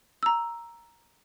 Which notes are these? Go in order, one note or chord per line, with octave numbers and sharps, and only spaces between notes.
A#5 E6